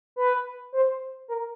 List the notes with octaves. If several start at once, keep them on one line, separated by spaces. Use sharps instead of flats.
B4
C5
A#4